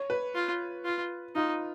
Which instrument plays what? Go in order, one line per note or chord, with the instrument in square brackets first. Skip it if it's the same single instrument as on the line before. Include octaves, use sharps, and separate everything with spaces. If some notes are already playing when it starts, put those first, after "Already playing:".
Already playing: [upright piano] C#5
B4
[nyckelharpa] F4
F4
[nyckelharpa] D#4 [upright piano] F4